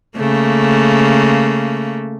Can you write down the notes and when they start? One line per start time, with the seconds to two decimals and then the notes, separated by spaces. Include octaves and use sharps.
0.17 C#3 A3 A#3